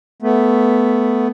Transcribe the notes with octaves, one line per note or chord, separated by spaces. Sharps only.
A3 B3